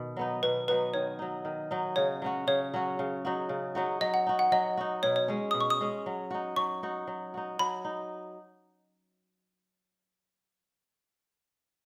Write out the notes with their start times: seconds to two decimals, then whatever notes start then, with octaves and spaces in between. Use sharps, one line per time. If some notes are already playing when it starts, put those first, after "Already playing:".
Already playing: B2 D#3
0.17 F#3 B3 D#4
0.43 B2 B4
0.68 F#3 B3 D#4 B4
0.94 D#3 C#5
1.19 F#3 D#4
1.45 D#3
1.71 F#3 D#4
1.96 C#3 C#5
2.22 F#3 C#4 F#4
2.47 C#3 C#5
2.74 F#3 C#4 F#4
2.99 C#3
3.25 F#3 D#4 F#4
3.49 C#3
3.75 F#3 D#4 F#4
4.01 F#3 D#5
4.14 F#5
4.27 D#4 F#4
4.39 F#5
4.52 F#3 D#5
4.77 D#4 F#4
5.03 B2 C#5
5.16 C#5
5.28 G#3 C#4
5.51 B2 D#6
5.61 C#6
5.70 D#6
5.81 G#3 C#4
6.06 F#3
6.31 D#4 F#4
6.56 F#3 C#6
6.83 D#4 F#4
7.07 F#3
7.34 D#4 F#4
7.59 F#3 B5
7.85 D#4